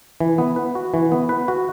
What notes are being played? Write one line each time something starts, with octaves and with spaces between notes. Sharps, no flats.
E3
B3
B4
F#4
E3
B3
B4
F#4